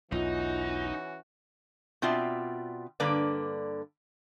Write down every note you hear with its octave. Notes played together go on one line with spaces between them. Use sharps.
B1 E2 E3 C#4 D#4 F4 F#4
B2 C4 F4 D5 E5
G2 D3 A#3 B4 D5